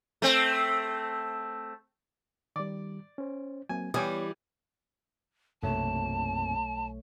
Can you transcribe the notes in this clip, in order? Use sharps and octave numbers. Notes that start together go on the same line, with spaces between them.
A3 C4
D#3 G3 D5
C#4 C5
F#3 A#3 C4 G#5
E3 G3 B3 C#5 G5 G#5 D#6
B1 F#2 C3 A3 A#3 C#5 A5